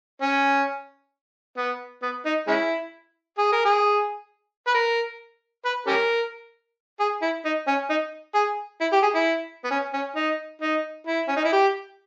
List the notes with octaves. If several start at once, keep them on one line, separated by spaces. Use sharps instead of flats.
C#4
B3
B3
D#4
G#3 C#4 E4
G#4
A#4
G#4
B4
A#4
B4
C#4 G4 A#4
G#4
E4
D#4
C#4
D#4
G#4
E4
G4
G#4
E4
B3
C#4
C#4
D#4
D#4
E4
C#4
D#4
E4
G4